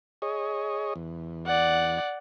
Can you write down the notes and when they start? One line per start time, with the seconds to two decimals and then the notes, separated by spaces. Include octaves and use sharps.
0.22 G#4 C#5 D#5
0.96 E2
1.47 D5 F#5